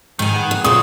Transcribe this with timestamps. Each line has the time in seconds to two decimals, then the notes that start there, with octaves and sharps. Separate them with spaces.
0.19 G#2 D#3 G#5
0.34 G#4 B4 F#5
0.51 A#3
0.64 A#2 C#3 F#3 E4 F4 G#4 C5 D#6